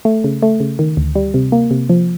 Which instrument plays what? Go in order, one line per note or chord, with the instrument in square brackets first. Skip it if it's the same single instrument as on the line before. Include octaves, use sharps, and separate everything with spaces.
[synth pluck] A3
C#3
A3
C#3
D#3
D2
G3
C3
A#3
C3
F3